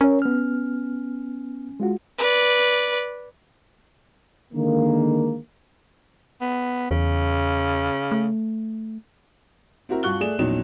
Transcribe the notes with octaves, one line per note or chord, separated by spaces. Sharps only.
C#4 A#4 C#5
B3 F6
G#3 F4 F#4
B4 D5
D3 D#3 G#3 A#3
B3
E2 C#3
A3
C4 E4 F#4 A#4
G2 F4 F#4 C#6 F#6 G7
A3 G#4 D5 E7
A#1 E2 F#3 C#4 D#4 E7